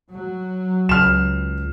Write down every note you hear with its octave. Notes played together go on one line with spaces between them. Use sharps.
F#3
C#2 F6 E7